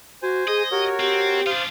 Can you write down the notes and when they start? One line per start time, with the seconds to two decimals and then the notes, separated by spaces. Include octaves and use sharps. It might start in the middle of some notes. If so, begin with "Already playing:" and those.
0.22 F#4 C5 G#5
0.48 G#4 D#5
0.71 F#4 G4 A#4 C#5
1.00 C4 G4
1.47 D4 F4 C5 F5 D#6